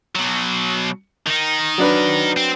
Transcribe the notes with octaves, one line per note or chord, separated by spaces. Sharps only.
B2 F#3
D#3 D#4
F#3 D4 B4
C4